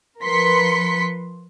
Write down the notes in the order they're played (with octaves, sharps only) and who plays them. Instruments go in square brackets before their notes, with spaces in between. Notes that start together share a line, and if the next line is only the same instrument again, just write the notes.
[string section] F3 A#4 B4 C6 B6 C#7